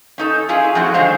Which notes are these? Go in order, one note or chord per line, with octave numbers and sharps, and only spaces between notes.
C#4 D#4 A4
C#4 E4 F4 G#4
F3 A3 C4 E4 F#4 F#5
D3 D#3 G#3 C4 C5 F5